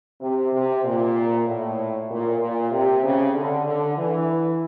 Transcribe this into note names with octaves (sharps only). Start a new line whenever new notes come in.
C3
C3
A#2
A2
A#2
A#2
C3
C#3
D3
D3
E3